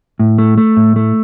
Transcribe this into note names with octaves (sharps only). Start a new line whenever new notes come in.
A2
A3
A3
A2
A3